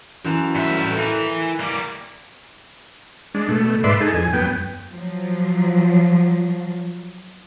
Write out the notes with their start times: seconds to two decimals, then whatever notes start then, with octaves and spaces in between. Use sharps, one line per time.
0.24 F#2 E3 A5
0.56 G2 B4 C5 E5
0.80 A2 G5 A5
0.97 E3 A#4 F5 B5
1.60 G3 A#3
3.35 G#3 D4
3.49 B2 A3
3.84 G#2 B4 D5 E5 C6
4.01 D#4 G#4 A4
4.13 F2 G#5
4.33 F#2 B3 G5
4.93 F3 F#3